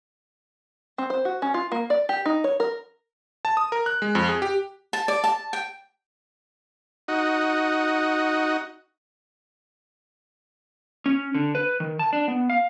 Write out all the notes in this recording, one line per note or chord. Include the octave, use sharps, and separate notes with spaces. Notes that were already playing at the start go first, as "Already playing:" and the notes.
C4
C5
F#4
C#4
F4
A#3
D5
G4
D#4
C#5
A#4
A5
D#6
A#4
F#6
G#3
F2
G#4
G4
A5
D5
A5
G5
D#4 F#4
C#4
D3
B4
D#3
A5
D4
B3
F5